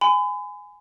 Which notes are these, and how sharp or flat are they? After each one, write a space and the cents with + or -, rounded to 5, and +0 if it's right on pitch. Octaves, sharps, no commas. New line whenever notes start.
G#5 +0 B5 +40